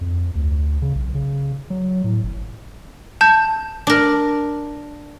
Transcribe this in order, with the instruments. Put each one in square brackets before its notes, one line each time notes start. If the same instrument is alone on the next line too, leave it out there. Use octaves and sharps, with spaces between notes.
[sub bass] F2
D2
C#3
B1
C#3
F#3
A2
G1
[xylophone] A5 G6
[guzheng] D4 A#4